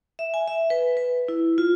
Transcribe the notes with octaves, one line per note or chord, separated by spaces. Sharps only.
E5
G#5
E5
B4
B4
E4
F4